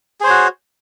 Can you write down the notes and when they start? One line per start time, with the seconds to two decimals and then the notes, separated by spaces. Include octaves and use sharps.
0.20 G#4
0.24 C5
0.27 C#5
0.30 F#4